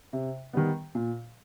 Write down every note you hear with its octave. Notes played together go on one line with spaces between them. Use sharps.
C3
D#3 G3 B3
A#2